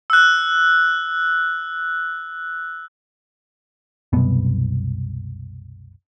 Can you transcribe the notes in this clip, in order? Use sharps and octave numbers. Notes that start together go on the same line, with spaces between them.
E6 F#6
C2 F#2 B2 B3